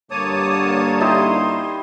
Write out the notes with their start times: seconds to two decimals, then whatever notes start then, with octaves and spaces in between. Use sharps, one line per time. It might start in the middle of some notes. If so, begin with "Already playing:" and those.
0.11 G2 D3 A#3 C#5 A5 D6 D#6
1.01 D#4 E4 G4 C6